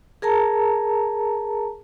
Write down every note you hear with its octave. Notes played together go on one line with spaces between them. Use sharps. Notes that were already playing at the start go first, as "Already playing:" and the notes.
G#4 A#4 A5 A#5